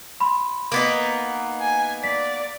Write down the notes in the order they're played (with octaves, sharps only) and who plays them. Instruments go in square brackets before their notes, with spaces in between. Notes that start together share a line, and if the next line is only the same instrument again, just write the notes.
[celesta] B5 C6
[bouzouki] A#3 B3 D#4
[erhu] G#5
[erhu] D5 [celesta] B6